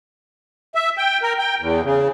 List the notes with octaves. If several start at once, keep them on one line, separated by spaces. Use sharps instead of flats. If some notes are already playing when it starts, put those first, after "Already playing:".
E5
G5
A#4
G5
E2
C#3